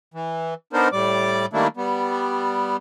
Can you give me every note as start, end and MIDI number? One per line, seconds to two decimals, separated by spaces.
0.14 0.54 52
0.73 0.88 59
0.73 0.88 62
0.73 0.88 63
0.73 0.88 70
0.73 0.88 72
0.93 1.46 45
0.93 1.46 55
0.93 1.46 74
0.93 1.46 86
1.53 1.67 51
1.53 1.67 55
1.53 1.67 57
1.53 1.67 58
1.53 1.67 62
1.53 1.67 64
1.77 2.77 55
1.77 2.77 59